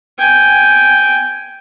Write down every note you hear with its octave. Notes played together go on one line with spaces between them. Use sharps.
G5 G#5